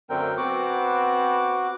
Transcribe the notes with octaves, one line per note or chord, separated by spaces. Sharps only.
F#2 D3 A3 C4 A#4 G5
B3 C4 F#4 F#5 D6